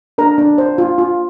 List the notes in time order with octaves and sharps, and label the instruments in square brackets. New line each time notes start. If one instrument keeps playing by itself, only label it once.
[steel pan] D4 A#4 A#5
D4
C5
F4
F4